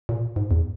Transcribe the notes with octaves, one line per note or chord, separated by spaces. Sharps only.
A#2
G#2
E2